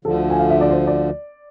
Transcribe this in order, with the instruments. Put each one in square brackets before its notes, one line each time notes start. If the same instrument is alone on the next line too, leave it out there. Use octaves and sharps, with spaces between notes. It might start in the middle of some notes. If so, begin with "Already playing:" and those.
[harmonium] D2 D3 F3 [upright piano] A4
[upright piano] G#5
F5
E5
D5
C5
D5